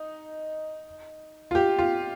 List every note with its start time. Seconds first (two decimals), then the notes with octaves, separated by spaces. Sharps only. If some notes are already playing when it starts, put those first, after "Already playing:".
Already playing: D#4
1.51 F4
1.55 G4
1.78 F4